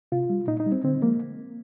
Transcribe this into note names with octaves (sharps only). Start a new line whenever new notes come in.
C3 F4
G3
A#2 D#4
D#4
G3
C4
D3 C4
F3 G#3 A#3